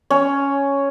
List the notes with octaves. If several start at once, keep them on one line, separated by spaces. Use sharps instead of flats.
C#4